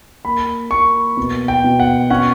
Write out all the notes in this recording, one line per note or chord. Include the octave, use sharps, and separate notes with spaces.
A#3 B5
A#3 C#6
B2
G5
B2
F#5
C#4 F#5